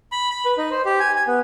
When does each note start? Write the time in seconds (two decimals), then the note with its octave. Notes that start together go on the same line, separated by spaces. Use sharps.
0.12 B5
0.31 B5
0.45 B4
0.58 D#4
0.71 C5
0.85 G4
1.00 G#5
1.16 G#5
1.27 B3